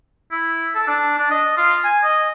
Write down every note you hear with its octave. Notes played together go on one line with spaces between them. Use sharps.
E4
A4
D4
D4
D#5
F4
G#5
D#5